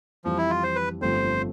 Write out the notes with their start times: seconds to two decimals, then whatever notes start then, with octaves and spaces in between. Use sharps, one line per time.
0.25 F2 E3 F3 G3
0.38 E4
0.50 F4
0.63 C5
0.76 B4
1.01 G1 G2 F3 A3 C4 C5